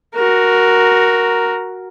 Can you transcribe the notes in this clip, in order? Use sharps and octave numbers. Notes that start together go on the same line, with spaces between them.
F#4 A#4